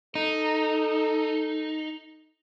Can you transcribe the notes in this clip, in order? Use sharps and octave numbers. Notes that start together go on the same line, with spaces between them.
D#4 A4